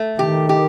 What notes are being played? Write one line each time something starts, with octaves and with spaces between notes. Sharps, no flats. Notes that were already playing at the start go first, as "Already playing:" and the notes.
Already playing: A3
D#3 G4
G4